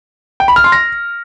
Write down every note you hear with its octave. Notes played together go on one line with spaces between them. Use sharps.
G5
B5
F6
C6
A#6